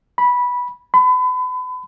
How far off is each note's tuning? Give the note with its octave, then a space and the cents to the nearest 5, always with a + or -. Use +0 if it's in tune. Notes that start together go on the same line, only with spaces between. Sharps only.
B5 -10
B5 +35